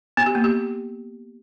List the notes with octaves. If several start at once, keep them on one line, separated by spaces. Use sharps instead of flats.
B3
G4
A#3
G4